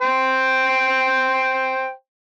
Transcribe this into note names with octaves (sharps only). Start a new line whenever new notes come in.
C5 G5